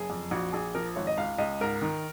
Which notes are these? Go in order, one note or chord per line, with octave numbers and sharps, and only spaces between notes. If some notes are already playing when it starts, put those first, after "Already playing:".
Already playing: F#1 G#4
F2
A#1 F#4
A#1 G#4
F3 A#4
G#1 C#5
D#5
C#2 F5
C#2 D#5
G#2 A#4
D#3